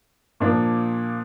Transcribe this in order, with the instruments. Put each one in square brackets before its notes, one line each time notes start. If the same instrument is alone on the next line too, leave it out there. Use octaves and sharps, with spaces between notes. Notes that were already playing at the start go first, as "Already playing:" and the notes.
[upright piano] A#2 F3 A#3 D4